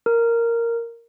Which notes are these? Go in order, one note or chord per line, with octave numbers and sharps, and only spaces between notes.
A#4